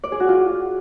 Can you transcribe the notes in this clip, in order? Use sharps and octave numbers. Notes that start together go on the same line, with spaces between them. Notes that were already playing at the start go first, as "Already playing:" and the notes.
D5
G#4
F#4
F4